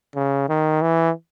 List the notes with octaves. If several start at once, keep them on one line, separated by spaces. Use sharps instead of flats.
C#3
D#3
E3